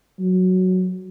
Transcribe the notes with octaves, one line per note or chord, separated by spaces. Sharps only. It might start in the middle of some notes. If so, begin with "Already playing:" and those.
F#3